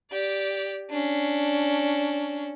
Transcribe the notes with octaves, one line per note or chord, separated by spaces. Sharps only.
G4 D5
C#4 D4